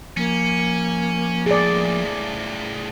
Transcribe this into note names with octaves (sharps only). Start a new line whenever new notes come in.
F3 A#3 C#4
A2 C#3 G#4 D5